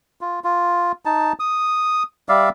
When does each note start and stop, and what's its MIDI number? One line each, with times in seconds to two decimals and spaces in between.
0.21 0.40 65
0.44 0.92 65
1.05 1.33 63
1.05 1.33 81
1.40 2.03 87
2.29 2.49 55
2.29 2.49 74
2.29 2.49 76
2.29 2.49 77